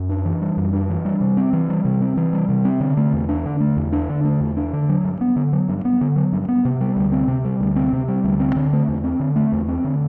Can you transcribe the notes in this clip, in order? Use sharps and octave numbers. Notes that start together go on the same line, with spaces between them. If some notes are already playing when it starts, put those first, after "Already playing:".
Already playing: F#2
D4
E3
G3
F#2
D4
E3
G3
C3
C4
E3
G3
C3
C4
E3
G3
C3
C4
D3
A3
E2
D4
D3
A3
E2
D4
D3
A3
E2
D4
D3
F#3
G2
B3
D3
F#3
G2
B3
D3
F#3
G2
B3
C3
G3
D2
C4
C3
G3
D2
C4
C3
G3
D2
C4
D3
A3
E2
C4
D3
A3
E2
C4
D3